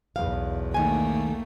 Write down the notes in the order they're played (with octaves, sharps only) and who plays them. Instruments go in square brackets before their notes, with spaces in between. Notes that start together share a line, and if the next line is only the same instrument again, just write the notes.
[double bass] B1 E2 [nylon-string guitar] F5
[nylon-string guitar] D#3 G#5 [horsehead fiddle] A3 A#3